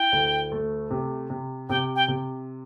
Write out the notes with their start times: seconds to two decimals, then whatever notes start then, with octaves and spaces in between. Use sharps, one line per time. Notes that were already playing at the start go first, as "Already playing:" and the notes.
Already playing: E4 G5
0.12 D2
0.52 A3
0.91 C3
1.30 C3
1.69 C3 G5
1.96 G5
2.08 C3